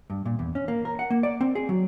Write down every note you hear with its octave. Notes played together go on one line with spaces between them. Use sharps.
G2
A#2
E2
C#4
A#3
A#4
F#5
A#3
D5
C4
G#4
F#3